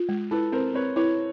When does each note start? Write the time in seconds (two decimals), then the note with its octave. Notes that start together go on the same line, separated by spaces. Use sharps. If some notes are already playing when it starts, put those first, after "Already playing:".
Already playing: F4
0.09 G#3
0.31 E4 A4 B4
0.52 C4 A#4 C5
0.74 C4 B4 C#5
0.96 E4 B4 C#5